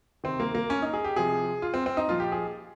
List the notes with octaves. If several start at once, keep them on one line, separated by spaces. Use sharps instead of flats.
C3 D#3 C4
A#3
A#3
C#4
D#4
G#4
G4
C3 F3 G#4
F4
C4
C4
D#4
A#2 F3 F4
G4
G#4